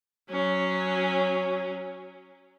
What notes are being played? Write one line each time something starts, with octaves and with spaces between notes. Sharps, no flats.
F#3 C#4